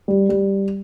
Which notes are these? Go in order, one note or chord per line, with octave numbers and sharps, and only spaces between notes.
G3
G3